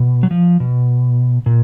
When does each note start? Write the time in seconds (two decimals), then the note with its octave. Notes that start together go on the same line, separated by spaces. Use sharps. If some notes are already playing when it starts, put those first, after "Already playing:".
Already playing: B2
0.23 F#3
0.31 F3
0.60 B2
1.46 A#2